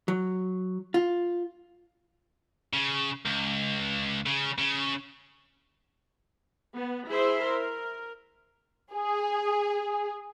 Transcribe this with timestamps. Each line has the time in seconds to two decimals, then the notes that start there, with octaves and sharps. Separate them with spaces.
0.08 F#3
0.94 F4
2.73 C#3
3.25 C#2
4.26 C#3
4.58 C#3
6.76 B3
7.09 E4 G#4 C5 E5 C6
7.44 A#4
8.94 G#4